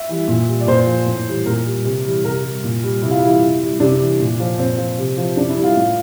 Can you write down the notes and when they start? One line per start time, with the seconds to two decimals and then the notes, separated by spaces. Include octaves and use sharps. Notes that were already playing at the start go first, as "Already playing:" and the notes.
Already playing: E5
0.09 E3 G3
0.28 A#2
0.47 G3
0.60 D5
0.67 A#2 C5
0.87 F3
1.06 A2
1.27 E3 G3
1.46 A#2 A#4
1.66 G3
1.85 C3
2.05 E3 G3
2.24 C3 A#4
2.44 G3
2.64 A#2
2.83 G3
3.02 C3 E4
3.11 F4
3.19 E3 G3 E4
3.42 C3
3.61 G3
3.80 C3 D4
4.00 E3 G3
4.20 A#2
4.40 F3
4.59 A#2 C4
4.78 F3
4.98 C3
5.17 F3
5.37 C3 D4
5.49 E4
5.57 G3
5.64 F4
5.76 A2